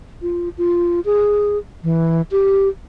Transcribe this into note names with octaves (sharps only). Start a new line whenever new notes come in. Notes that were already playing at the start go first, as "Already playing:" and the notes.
F4
F4
G#4
E3
G4